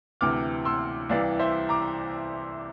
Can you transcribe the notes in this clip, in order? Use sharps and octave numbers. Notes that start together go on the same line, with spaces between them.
D2 C3 E3 D6 F6
C6 E6
C2 C3 E3 D5 F5
C5 E5
A#5 D6